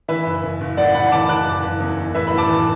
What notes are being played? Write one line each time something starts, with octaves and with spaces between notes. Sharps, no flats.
E3 B4 E5
F#1
F#1
F#1
A1 D5 F#5
A1 F#5 B5
B5
E3 A5 D6
E3 D6 F#6
F#1
F#1
E2
F#1
A1 B4 E5
A2 B5
A5 D6
E3